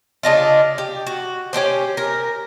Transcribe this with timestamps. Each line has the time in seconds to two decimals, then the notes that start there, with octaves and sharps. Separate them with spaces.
0.23 C#3 D4 D#4 F4
0.78 G4
1.07 F#4
1.53 C#4 D4 G4 C5
1.97 A#4